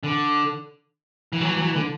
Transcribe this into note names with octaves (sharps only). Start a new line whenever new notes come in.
D3
E3
F#3
E3
F#3
E3
D3